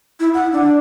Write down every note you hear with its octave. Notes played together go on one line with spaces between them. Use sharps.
E4
F#5
D4